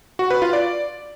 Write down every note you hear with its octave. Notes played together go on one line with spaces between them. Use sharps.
F#4
B4
F4
D5